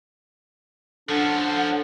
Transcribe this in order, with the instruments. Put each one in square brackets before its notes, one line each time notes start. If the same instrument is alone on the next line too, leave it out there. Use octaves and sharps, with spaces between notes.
[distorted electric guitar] F3 C#4 [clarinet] D4 [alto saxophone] A4 [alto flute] F#5